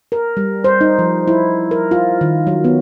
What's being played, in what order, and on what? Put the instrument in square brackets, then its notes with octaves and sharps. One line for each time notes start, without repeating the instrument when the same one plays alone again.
[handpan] A#4
G3
C5
D#4
F3
E4
A#4
F4
D#3
F#3
B3